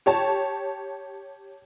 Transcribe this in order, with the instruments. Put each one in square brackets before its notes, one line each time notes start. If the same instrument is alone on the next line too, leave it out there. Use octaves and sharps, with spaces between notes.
[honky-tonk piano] G4 C#5 A5